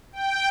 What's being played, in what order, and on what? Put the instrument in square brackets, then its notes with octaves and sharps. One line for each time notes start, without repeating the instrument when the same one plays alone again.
[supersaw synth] G5